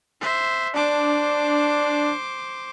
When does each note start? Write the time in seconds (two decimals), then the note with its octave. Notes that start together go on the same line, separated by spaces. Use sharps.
0.21 C5 E5
0.75 D4 C5 D6